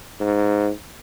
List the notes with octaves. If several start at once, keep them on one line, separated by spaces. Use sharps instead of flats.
G#2